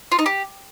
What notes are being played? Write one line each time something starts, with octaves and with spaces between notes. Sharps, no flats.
F4
D#4
G4